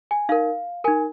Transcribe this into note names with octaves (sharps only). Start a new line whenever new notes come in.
G#5
D#4 A#4 F5
D#4 A#4 G#5